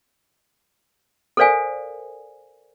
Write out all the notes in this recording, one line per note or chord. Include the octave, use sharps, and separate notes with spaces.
A4 A#4 C5 D5 F5 G#5